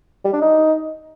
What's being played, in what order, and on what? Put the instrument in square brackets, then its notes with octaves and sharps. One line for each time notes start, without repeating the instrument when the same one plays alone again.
[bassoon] G3
D4
D#4